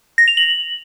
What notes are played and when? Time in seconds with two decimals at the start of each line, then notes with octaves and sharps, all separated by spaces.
0.18 A#6
0.28 F7
0.37 F#7